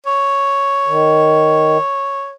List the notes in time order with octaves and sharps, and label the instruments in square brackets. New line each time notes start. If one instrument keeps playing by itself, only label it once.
[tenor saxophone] C#5
[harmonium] D#3